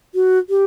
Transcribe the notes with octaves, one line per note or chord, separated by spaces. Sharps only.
F#4
G4